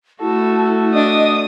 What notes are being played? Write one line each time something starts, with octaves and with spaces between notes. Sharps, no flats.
A3 E4 F#4 A4
D4 D#5 D#6